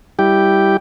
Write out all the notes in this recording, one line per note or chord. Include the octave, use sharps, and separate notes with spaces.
G3 E4 G4 G5